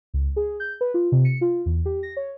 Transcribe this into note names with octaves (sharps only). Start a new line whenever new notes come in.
C#2
G#4
G6
B4
F4
C3
C#7
F4
E2
G4
A#6
C#5